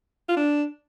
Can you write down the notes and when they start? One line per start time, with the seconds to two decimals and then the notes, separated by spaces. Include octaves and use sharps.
0.29 F4
0.37 D4